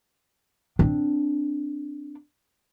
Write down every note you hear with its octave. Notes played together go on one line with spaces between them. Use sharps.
C4 D4